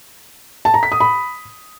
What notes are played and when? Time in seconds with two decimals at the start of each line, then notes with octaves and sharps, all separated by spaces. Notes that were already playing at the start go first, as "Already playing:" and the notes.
0.65 A5
0.74 A#5
0.83 B6
0.92 D#6
1.00 B5